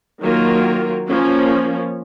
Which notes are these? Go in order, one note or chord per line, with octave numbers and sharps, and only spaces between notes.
D#3 F#3 A#3 F4 A#4
F3 A#3 C#4